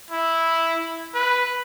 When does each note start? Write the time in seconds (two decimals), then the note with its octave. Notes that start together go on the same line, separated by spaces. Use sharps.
0.11 E4
1.15 B4